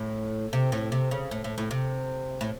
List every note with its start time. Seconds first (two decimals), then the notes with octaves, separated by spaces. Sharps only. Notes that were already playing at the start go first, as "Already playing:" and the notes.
Already playing: A2
0.53 C3
0.72 A2
0.92 C3
1.11 C#3
1.31 A2
1.44 A2
1.58 A2
1.71 C3
2.41 A2